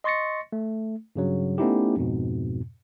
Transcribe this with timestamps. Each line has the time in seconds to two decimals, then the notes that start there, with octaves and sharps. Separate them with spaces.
0.04 D#5 C6 C#6 A6 A#6 C#7
0.52 A3
1.16 G2 C#3 F#3
1.58 A3 B3 C#4 D#4 E4 G4
1.97 F2 G#2 B2